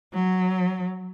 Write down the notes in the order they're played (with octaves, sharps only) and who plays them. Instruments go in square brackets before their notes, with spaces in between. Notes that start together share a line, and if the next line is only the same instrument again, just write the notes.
[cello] F#3